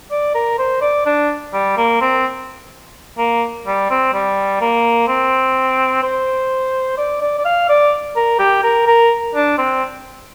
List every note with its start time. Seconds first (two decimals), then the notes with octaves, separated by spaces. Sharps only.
0.10 D5
0.35 A#4
0.58 C5
0.81 D5
1.06 D4
1.53 G3
1.77 A#3
2.01 C4
3.18 A#3
3.66 G3
3.90 C4
4.13 G3
4.61 A#3
5.07 C4
6.03 C5
6.97 D5
7.21 D5
7.38 D5
7.45 F5
7.69 D5
8.16 A#4
8.39 G4
8.63 A#4
8.86 A#4
9.35 D4
9.58 C4